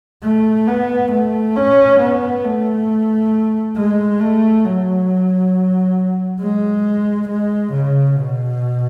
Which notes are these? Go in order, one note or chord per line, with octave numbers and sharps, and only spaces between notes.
A3
B3
A3
C#4
B3
A3
G#3
A3
F#3
G#3
G#3
C#3
B2